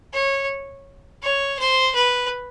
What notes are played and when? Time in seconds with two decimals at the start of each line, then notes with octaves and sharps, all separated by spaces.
0.13 C#5
1.22 C#5
1.59 C5
1.95 B4